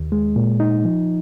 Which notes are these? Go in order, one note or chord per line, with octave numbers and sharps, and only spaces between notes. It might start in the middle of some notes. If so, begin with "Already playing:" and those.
Already playing: D#2
G#3
A#2
D#4
F3